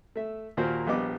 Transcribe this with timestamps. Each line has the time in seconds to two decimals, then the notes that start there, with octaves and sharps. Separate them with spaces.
0.16 A3 E5
0.57 D#2 A#2 F#4 A#4 C5
0.87 A#1 G3 B3 D#5 D6